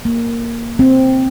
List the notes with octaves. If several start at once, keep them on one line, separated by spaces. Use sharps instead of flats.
A#3
C4